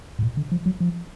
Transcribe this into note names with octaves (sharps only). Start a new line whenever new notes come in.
A2
A#2
D3
F3
F#3
F3